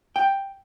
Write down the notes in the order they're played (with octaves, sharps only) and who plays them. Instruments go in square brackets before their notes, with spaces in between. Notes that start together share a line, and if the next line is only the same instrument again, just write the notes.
[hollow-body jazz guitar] G5